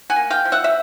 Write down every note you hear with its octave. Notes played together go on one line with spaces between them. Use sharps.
F#5 G#5
A#3
F5 G5
F3
E5 F#5
E5